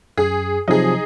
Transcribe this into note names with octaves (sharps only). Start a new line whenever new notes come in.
F#2 G#4
C3 F3 F#3 D#4 G#4